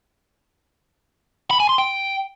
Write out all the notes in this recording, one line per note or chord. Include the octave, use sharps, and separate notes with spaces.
B5
G#5
C6
G5